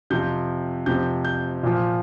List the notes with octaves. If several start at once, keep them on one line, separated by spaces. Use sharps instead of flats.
F2 C3 F3 G6
F2 C3 F3 G6
G6
A#2 F3